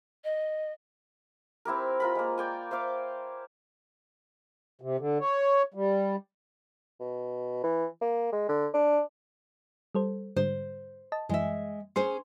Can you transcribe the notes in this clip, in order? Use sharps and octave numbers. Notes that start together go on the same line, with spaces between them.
D#5
C4 E4 G4 A#4
F4 A#4 B5
G#3 A#3
D5 G5 G#5
C5 E5 F5 D6
C3
D3
C#5
G3
B2
E3
A#3
G#3
D3
D4
G3 A4 C5
G#2 D3 G3 C5
D#5 A5
F#2 E3 G#3 E5
C#4 G#4 C5 C6